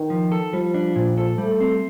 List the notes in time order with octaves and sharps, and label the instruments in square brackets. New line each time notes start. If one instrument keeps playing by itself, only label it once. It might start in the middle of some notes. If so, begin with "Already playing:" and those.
Already playing: [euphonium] D#3
[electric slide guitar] F3
A4
[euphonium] F3 [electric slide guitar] G3
[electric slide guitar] D4
A#2
A4
[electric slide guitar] G3 [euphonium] A3
[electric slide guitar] C4